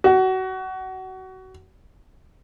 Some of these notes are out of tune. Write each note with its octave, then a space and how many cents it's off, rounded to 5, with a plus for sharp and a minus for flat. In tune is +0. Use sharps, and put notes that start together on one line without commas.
F#4 +25